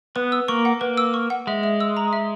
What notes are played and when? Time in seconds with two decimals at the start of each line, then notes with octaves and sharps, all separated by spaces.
0.16 B3 B4
0.32 E6
0.48 A#3 C#6
0.65 F#5
0.81 A#3 B4
0.97 E6
1.14 C#6
1.30 F#5
1.47 G#3 E5
1.63 E5
1.80 E6
1.97 A#5
2.13 E5